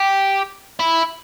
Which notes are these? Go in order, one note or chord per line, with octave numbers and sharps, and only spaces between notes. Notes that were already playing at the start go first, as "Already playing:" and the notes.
Already playing: G4
E4